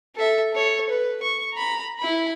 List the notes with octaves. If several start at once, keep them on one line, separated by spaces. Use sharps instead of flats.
A4 E5
A4 C#5
B4
C#6
A#5 B5
E4 B5